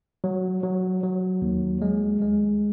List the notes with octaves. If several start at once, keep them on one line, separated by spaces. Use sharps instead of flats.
F#3
F#3
F#3
D#2
G#3
G#3